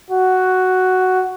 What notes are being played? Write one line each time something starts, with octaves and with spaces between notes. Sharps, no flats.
F#4